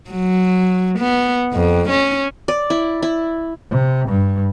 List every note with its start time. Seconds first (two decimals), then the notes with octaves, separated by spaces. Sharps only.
0.10 F#3
0.99 B3
1.53 F2
1.89 C#4
2.48 D5
2.70 E4
3.03 E4
3.70 C3
4.09 G2